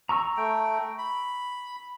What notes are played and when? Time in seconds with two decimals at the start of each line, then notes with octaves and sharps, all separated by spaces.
0.09 A#5 C#6 E6
0.37 A3 G5
0.98 B5